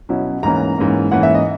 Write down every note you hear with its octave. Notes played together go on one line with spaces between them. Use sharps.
B2 F#3 C#4 E4
G#2 E3 A#3 C#4 A#5
G#2 E3 A#3 C#4
G#2 E3 A#3 C#4 F#5
E5
D#5